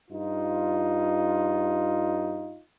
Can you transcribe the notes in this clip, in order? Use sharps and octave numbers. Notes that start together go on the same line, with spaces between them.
G2 D#4 F4